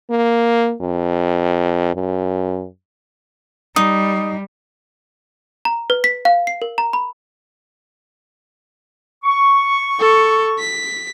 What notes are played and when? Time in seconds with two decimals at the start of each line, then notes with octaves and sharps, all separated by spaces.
0.10 A#3
0.81 F2
1.95 F#2
3.76 G3 D#4 D#6
5.65 A#5
5.90 B4
6.04 B6
6.25 F5
6.47 C7
6.62 A#4
6.78 A#5
6.93 B5
9.23 C#6
10.00 A4
10.59 B6